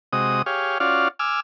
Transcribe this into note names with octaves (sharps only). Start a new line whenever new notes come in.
C3 G#3 F#4 D#5 D#6
G4 G#4 C#5 F5
C#4 F4 F#4 D5 F5
G#5 D6 E6 F6